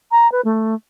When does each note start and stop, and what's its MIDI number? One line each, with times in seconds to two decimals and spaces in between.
0.11 0.30 82
0.32 0.41 71
0.45 0.75 57